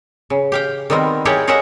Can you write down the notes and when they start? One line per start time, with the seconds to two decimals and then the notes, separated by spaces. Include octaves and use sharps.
0.30 C#3
0.52 G4 F5 G5
0.90 D#3 G3 B3 C4 A#4
1.25 E4 G4 G#4 A#4 C#5 D5
1.48 G#4 A#4 C#5 D#5 E5 F#5